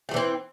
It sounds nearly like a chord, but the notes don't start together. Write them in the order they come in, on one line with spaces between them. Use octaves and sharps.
A3 F#3 E3 C4